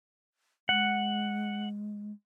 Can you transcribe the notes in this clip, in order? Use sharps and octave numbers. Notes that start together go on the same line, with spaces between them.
G#3 F#5